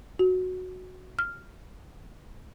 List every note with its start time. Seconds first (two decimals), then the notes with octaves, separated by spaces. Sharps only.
0.19 F#4
1.19 F6